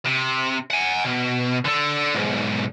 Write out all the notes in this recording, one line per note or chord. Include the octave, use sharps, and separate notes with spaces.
C3
F#5 G#5
B2
D3 A4
B1 G#2